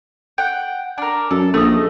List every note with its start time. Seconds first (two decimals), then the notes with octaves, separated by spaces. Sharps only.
0.38 F#5 G5
0.98 D4 A#4
1.31 F#2 A4
1.54 A#1 A3 D#5